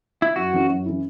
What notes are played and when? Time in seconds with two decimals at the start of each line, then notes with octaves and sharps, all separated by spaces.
0.22 E4
0.36 F#2 F#4
0.53 E3 C#4 E4
0.69 F#2
0.86 E3 C#4 E4